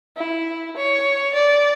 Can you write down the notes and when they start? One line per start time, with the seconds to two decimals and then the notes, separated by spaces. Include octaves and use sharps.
0.17 E4
0.76 C#5
1.34 D5